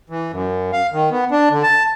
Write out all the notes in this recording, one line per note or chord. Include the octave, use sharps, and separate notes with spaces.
E3
F#2
F5
D#3
B3
D4
D3
A5